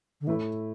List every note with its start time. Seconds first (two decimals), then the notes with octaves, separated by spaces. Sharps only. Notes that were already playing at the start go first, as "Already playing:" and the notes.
0.21 D3
0.27 A2 E3 A3 E4